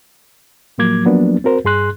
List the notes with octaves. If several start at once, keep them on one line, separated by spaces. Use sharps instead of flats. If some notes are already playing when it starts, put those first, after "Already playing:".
A2 F3 F#3 A#3 D6 G#6
F3 F#3 A#3 B3 D4
C4 F#4 A#4 C5
G2 G#4 C6 F#6